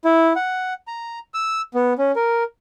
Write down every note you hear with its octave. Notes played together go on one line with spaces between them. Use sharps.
E4
F#5
A#5
E6
B3
C#4
A#4